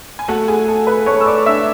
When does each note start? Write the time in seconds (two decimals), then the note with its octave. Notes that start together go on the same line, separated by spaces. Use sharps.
0.19 G#5
0.28 A3 F#4 F#5
0.48 G#4 G#5
0.68 A4
0.87 B4 B5
1.06 A3 C#5 C#6
1.21 E6
1.26 D5 D6
1.46 D4 E5 E6